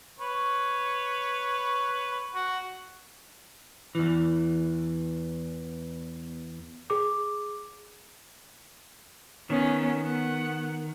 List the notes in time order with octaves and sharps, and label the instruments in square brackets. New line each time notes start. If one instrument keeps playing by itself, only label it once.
[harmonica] B4 C#5
F#4 F#5
[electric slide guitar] E2 E3
[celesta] G#4 D6
[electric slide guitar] D#3 [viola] B3 C#4
[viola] B3 F#5